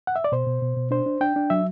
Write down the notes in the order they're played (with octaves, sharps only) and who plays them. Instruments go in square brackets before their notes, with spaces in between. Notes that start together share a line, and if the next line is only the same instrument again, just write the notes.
[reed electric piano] F#5
E5
D5
B2 C5
B2
B2
B2
D4 C5
D4
D4 G5
D4
F#3 E5